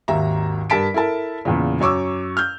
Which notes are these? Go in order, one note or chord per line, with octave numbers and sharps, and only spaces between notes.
G#1 D#2 E5 A#5
G2 A#4 A5 B6 D7
E4 A4 A#4 A5
E2 A#2 C#3
F#2 C#5 C#6 D6 E6
F6 G6